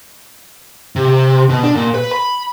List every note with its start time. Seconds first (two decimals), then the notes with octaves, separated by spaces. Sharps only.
0.96 C3
1.49 B2
1.63 D4
1.75 A#2
1.94 B4
2.11 B5